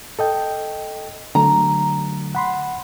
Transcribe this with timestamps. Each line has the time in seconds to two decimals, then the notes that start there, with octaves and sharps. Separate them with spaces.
0.19 A4 D#5 G5
1.35 D3 F#3 A3 A#5
2.35 F#5 B5 C6